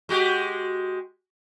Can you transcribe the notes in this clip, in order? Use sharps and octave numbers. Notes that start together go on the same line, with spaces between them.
G#3 F#4 G4